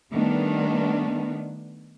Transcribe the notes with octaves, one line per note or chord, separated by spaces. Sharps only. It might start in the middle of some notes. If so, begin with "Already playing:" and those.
D#3 G3 A3 B3 D4